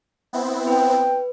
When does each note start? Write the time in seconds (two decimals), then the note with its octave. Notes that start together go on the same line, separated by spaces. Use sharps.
0.33 B3 C4 E4
0.67 B4 G5